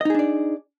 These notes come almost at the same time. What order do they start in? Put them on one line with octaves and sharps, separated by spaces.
D#5 D#4 G#4 D4 D5